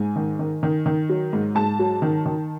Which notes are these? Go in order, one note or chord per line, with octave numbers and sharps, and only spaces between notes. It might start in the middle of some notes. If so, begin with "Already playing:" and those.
Already playing: G#2 G#5
D#3
D#3
D#3
D#3
F#3
G#2
G#2 A5
F#3
D#3
D#3